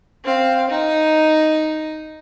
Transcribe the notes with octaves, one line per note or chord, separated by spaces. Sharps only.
C4 F5
D#4